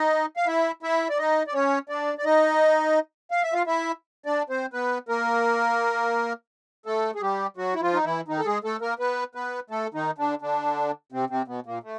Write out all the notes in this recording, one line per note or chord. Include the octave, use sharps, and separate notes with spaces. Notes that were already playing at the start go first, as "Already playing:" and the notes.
Already playing: D#4 D#5
F5
E4 E5
E4 E5
D5
D#4 D#5
D5
C#4 C#5
D4 D5
D5
D#4 D#5
F5
E5
F4 F5
E4 E5
D4 D5
C4 C5
B3 B4
A#3 A#4
A3 A4
G#4
G3 G4
F#3 F#4
E4
F3 F4
D#4
E3 E4
D#3 D#4
A4
G#3 G#4
A3 A4
A#3 A#4
B3 B4
B3 B4
A3 A4
D#3 D#4
D3 D4
D3 D4
C3 C4
C3 C4
B2 B3
A#2 A#3
A3